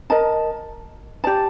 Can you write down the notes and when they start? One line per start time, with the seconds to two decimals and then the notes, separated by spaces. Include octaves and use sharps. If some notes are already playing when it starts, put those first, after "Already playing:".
0.10 A#4 D#5 A5
1.24 G4 D5 A5